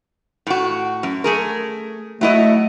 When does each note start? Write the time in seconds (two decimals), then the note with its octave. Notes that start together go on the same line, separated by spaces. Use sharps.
0.47 A2 F#4
1.03 F#2
1.24 A3 G#4 A#4
2.21 F#3 A3 E4 D#5